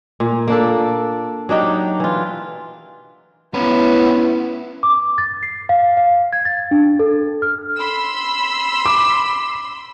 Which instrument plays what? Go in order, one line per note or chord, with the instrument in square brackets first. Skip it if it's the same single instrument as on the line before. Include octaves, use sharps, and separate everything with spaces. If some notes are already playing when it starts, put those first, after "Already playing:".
[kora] A#2
A#3 D4 A4
F#3 D4 D#4 G4
E3 F4
[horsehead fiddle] B3 E4 [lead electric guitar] C#4 B4
[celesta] D6
A6
C7
F5
F5
G#6
A6
D4
A4
F6
[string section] B5 C6 E6
[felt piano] D6